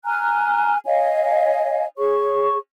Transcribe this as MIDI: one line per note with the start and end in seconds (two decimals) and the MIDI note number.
0.05 0.76 80
0.05 0.76 82
0.05 0.76 89
0.05 0.76 90
0.85 1.85 73
0.85 1.85 75
0.85 1.85 77
0.85 1.85 80
1.97 2.57 68
1.97 2.57 73
1.97 2.57 85